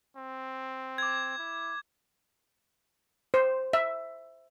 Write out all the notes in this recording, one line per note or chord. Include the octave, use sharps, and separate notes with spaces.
C4
D6 G#6
E4
C5
E5